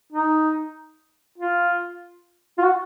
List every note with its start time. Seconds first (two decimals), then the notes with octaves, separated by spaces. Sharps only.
0.12 D#4
1.38 F4
2.58 F4
2.63 F#4